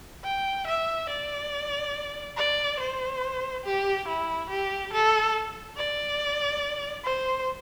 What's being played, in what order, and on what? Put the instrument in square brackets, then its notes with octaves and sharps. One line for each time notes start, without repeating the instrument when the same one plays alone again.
[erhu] G5
E5
D5
D5
C5
G4
E4
G4
A4
D5
C5